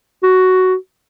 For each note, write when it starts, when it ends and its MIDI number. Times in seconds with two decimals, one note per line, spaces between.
0.23 0.75 66